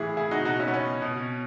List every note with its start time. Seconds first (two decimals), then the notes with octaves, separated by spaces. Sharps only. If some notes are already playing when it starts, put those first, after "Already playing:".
Already playing: A2 E3 E4 G#4
0.17 E4 G#4
0.31 D#4 F#4
0.45 B2 D#4 F#4
0.59 C#4 E4
0.68 B3
0.74 C#4
1.02 B2